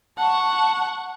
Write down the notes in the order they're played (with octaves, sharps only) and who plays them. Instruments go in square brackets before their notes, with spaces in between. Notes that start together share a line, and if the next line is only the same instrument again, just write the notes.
[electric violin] F#5 C#6 [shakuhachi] A5